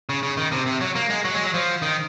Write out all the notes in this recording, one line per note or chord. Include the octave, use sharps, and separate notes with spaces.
C#3
C#3
D#3
C3
C3
F#3
A#3
G#3
F#3
G#3
F#3
F3
D#3